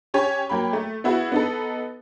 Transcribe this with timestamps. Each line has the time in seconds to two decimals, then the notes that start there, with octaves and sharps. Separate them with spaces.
0.14 C#4 G4 C#5 G#5
0.49 F#3 A#3 G5 B5
0.73 A3
1.04 B3 E4 F#4 G#4
1.32 B3 D#4 A4